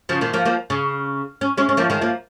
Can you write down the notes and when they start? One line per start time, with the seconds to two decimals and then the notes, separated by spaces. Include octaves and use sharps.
0.09 C#3 F3
0.21 A#2 D#3
0.33 F3 A#3
0.45 F3 A#3
0.70 C#3
1.41 C#4
1.57 G#3 C#4
1.69 C#4
1.77 F3 A#3
1.90 D#3 G#3
2.02 F3 A#3